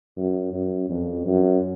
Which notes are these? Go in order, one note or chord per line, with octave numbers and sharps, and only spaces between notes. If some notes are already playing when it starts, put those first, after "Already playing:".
F#2
F#2
F2
F#2